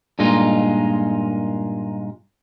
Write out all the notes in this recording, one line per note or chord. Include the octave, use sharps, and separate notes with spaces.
G2 A#2 G#3 D#4 F4